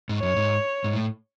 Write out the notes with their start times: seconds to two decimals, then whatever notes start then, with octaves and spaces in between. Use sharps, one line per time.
0.09 G#2
0.19 F#2 C#5
0.36 G#2
0.84 G#2
0.94 A2